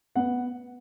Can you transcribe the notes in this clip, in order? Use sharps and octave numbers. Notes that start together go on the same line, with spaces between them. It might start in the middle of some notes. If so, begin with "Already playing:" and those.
B3 F#5